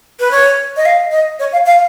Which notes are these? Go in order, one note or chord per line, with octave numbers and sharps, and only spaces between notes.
B4
C#5
D#5
F5
D#5
C#5
F5
F5